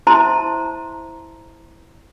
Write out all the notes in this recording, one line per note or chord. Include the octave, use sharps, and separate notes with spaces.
E4 C5 E5 A5 A#5 C6